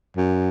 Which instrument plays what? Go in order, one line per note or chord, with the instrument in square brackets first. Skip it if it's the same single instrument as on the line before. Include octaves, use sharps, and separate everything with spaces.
[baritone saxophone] F#2